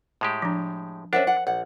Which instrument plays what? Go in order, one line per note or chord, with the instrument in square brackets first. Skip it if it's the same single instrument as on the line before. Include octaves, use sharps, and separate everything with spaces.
[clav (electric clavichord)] A2 G#3 G4
[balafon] F3 D4
[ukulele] C#4 E5 F#5 [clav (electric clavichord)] D4 [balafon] A#4 C5
[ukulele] F#5
[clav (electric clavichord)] A#1 [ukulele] F#5